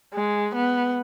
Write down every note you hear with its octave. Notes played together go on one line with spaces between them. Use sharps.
G#3
B3